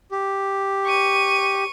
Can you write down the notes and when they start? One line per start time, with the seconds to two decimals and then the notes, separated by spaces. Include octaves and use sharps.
0.11 G4
0.86 C#6 D#7